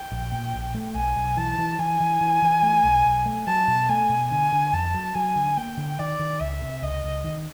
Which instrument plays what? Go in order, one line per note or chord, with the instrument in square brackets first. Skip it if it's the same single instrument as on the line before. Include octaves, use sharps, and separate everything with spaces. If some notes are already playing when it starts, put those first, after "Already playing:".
Already playing: [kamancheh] G5
[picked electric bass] A#1
A#2
A#1
A3
[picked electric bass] B1 [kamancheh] G#5
[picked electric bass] B1
[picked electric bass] E3 [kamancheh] A5
[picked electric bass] E3
[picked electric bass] E3 [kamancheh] G#5
[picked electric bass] E3
E3
E3
A3
B1
B1
A3
[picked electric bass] F#3 [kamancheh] A5
[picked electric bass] B2
[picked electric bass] A3 [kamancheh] G#5
[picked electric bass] B2
[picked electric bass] D3 [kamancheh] G#5
[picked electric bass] D3
[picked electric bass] F2 [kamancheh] A5
[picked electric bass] F#3
[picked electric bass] F#3 [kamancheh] G#5
[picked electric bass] D3
[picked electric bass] A#3 [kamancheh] G5
[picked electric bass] D3
[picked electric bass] D#3 [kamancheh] D5
[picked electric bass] D#3
[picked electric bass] C#2 [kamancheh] E5
[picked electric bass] C3
[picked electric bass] C#2 [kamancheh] D#5
[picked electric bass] C#2
D#3